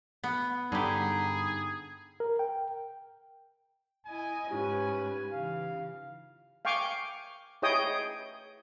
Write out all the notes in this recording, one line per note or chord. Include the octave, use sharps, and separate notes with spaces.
B3
G2 D3 D#4 G4 G#4 B5
A#4
G5
E4 D#5 G#5
G#2 C#4 D#4 F4 G4 B4
C#3 E3 F5
F5 G5 G#5 C#6 D6
E4 G#4 C#5 D#5 G5 D#6